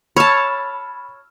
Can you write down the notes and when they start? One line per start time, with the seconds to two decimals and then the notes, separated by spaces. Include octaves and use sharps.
0.16 C#5 A5 B5 E6 F6